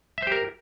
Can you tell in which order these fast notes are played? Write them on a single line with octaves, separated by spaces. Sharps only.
E5 C5 G4 A#4